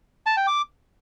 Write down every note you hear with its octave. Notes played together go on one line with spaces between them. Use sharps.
A5
G5
D6